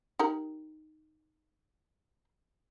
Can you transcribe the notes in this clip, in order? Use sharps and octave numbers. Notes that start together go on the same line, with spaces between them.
D#4 G4 A#4